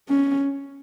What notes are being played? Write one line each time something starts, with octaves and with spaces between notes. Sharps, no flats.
C#4